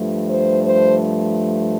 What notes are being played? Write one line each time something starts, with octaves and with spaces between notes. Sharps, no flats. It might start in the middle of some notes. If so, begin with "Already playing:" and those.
Already playing: G2 F3 A3
C5
C5